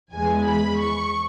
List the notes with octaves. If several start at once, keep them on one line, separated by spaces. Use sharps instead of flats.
E2 E3 G#3 G#5
B5
C#6